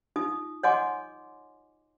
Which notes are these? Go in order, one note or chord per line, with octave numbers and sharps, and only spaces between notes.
D#4 F4 D#6
C#5 D#5 F#5 G#5 C6 D6